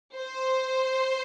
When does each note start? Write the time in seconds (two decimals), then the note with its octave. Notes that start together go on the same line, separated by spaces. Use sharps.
0.16 C5